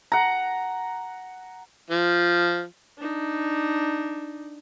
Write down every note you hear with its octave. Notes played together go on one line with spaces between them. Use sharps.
F#5 A#5
F3
D4 D#4